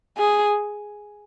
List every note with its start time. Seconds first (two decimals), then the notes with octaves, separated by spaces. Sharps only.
0.17 G#4